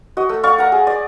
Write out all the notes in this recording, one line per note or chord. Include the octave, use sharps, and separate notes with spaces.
F#4 D#5
A3
D5 F5 C#6
F#5 A#5
G#4
D5